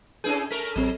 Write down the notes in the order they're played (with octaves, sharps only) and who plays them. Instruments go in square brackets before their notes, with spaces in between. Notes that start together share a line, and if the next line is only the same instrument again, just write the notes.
[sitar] C#4 E4 G#4 [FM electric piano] D4 B4 G6
[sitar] A3 A#4 [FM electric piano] B6
[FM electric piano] A1 C4 C#5 [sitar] F#3